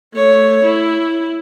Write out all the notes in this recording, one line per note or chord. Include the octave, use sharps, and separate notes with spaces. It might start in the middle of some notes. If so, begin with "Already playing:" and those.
A3 C#5
E4